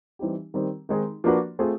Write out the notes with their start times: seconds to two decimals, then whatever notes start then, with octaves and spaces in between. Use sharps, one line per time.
0.19 E3 G3 C4 D#4 G4
0.54 D#3 G3 C4
0.89 D#3 G#3 C4 D#4 G#4
1.24 F3 A#3 D4 F#4 B4
1.59 A3 C4 F4 G#4 C5